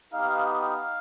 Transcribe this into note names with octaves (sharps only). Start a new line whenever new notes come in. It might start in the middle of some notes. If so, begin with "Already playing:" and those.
B3 D#4 G4 F5
F5